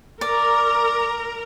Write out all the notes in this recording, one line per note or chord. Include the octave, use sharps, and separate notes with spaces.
A#4 D5 A#5